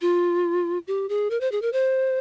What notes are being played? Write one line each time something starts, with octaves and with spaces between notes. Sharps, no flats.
F4
G4
G#4
A#4
C5
G#4
A#4
C5